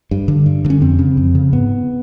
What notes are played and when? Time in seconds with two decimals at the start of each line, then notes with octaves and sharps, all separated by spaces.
0.11 G2
0.28 D3
0.46 G2
0.65 D3
0.70 C#4
0.81 F2 C4
0.99 C#3
1.17 F2
1.35 C#3
1.53 G#2 B3